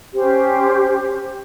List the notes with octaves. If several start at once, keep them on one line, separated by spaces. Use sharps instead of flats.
C#4 G4 C5